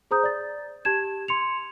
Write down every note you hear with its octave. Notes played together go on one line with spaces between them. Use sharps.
G#4 C5 A#5 D#6 G6
D5 A6
G4 A5 G#6 E7
C6 C#7 F7